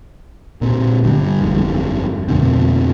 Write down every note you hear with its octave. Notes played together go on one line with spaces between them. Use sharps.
A#2 C4
G2 D3 G3
G1 F2 D3
F2 B2 D3 C4